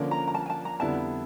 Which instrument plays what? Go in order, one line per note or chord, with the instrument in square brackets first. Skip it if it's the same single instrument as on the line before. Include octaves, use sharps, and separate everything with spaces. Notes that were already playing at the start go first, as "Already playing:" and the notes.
Already playing: [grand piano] D3 F3 A#3 C#4
[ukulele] A#5
A#5
A5
G#5
A5
A#5
[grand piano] F2 D3 G3 B3 E4 [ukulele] A5